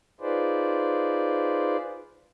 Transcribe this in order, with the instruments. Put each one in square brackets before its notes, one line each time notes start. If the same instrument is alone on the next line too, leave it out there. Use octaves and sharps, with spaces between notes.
[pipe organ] D#4 F4 G#4 B4 C5 D5